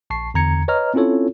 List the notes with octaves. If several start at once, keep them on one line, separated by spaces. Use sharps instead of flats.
A#1 A5 C#6 C7
E2 D3 A#5 G#6 C#7
B4 C#5 D#5 A#5 F6
C4 C#4 E4 F4 A4 C#5